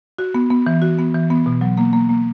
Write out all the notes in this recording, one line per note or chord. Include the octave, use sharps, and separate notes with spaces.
F#4
B3
B3
E3
F#4
B3
E3
B3
B2
F#3
A#3
A#3
A#3